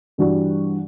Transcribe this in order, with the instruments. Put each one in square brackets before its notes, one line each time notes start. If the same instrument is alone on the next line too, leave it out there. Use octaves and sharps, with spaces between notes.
[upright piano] G2 E3 G3 D4 F#4